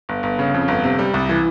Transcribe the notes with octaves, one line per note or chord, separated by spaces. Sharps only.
G1
G1
C#3
F2
G1
C3
G3
C2
E3